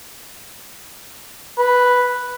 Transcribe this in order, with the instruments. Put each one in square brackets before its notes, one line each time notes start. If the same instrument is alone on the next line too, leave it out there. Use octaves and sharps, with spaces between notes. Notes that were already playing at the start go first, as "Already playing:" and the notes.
[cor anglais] B4